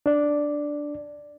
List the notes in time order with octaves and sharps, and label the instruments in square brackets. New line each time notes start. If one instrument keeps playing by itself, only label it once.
[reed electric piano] D4 D5